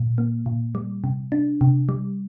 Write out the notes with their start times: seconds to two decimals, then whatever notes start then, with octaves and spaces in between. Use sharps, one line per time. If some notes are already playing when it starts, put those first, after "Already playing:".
Already playing: A#2
0.18 A#3
0.46 A#2
0.75 G3
1.04 C3
1.32 D4
1.61 C3
1.89 G3